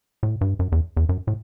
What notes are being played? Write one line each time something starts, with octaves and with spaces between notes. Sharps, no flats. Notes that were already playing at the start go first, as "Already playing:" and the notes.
A2
G2
F#2
E2
E2
F#2
A2